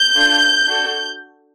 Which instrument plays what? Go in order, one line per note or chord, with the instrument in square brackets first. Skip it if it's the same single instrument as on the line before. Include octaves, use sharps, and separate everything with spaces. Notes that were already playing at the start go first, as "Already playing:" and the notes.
Already playing: [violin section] G6
D4 F4 A4
D4 F#4 A4